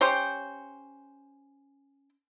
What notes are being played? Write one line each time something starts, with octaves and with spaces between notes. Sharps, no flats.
C#4 G4 C5